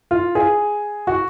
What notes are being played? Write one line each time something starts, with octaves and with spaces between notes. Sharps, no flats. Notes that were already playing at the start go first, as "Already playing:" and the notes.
F4
G#4
F#4